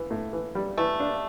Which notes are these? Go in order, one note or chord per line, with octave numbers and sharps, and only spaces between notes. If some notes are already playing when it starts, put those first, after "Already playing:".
Already playing: E3
A2
E3
G3
E3 A3
D4